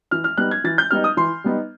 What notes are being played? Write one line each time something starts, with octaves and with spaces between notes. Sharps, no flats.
E3 F6
F6
G3 B3 D#4 F#6
G#6
E3 A6
G6
G3 B3 D#4 F6
D#6
E3 C6
G3 B3 D#4